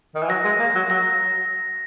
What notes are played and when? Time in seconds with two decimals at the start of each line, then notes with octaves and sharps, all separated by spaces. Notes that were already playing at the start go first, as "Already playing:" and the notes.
0.15 D#3
0.23 E3
0.29 F#3 A#6
0.45 G#3
0.60 A#3
0.75 F#3
0.90 F#3 A#6